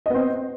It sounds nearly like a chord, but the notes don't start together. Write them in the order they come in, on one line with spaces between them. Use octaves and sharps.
D#5 B3 C4